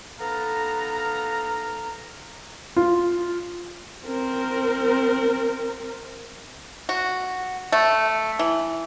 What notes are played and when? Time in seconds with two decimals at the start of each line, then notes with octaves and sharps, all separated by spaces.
0.19 B3 D#4 A4 F5 A#5
2.77 F4
4.05 C4 A#4
6.89 F#4
7.72 A3
8.39 E3